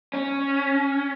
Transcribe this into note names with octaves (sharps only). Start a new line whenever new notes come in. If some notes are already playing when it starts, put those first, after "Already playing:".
C#4